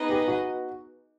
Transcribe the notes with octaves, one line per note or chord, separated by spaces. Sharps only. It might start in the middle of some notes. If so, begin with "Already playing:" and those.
Already playing: B3 D#4 G#4 B4 D#5
G4
F#4